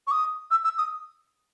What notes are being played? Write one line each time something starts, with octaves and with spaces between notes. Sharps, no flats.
C#6
D#6
E6
E6
D#6